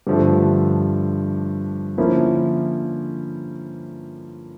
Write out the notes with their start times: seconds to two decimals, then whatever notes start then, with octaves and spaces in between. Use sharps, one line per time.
0.07 G2 D3 F3 A3
1.98 D3 F3 A#3 C#4 E4